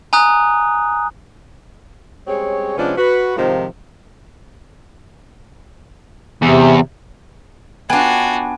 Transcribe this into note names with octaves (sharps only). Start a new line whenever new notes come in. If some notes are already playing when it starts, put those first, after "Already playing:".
G#5 A#5 D#6 F#6
G3 G#3 C4 C#4 C#5
C3 F3 G#3 B3 C#4 D4
F#4 B4
G#2 C3 D#3 F3
E2 C3
B3 D4 F4 F#4 G5 G#5 G#6